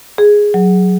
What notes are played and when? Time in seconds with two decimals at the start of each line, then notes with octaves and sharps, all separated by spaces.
0.18 G#4
0.54 F#3